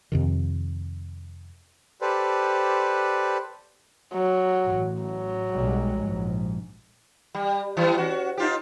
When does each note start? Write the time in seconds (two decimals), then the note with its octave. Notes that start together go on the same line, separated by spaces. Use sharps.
0.12 F2 C3 D#3
2.01 G4 A4 B4 C5 D5
4.14 F#3
4.65 A1
5.02 F#3
5.55 B1 G3 G#3
5.96 A#1 G#2
7.35 G3
7.77 E3 G3
7.98 C#4 F#4
8.37 D#4 F4 G4